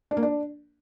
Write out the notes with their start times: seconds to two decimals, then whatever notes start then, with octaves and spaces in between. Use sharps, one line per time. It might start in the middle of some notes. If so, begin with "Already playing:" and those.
0.11 D4
0.17 A#3
0.23 D4